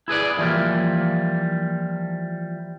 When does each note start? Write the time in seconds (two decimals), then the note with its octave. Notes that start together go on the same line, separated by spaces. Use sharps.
0.08 E4 G#4 B4 D5
0.38 D3 E3 F3 G3 A#3